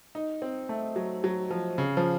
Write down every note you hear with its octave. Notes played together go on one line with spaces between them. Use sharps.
D#4
C4
A3
F#3
F#3
F3
C#3
F3